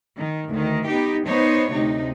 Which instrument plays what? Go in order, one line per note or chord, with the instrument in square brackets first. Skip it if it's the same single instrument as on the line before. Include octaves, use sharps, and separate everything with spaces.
[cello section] D#3
D2 D#3
B3 D#4 G4
B3 D#4 C5 C#5
D2 C3 D#4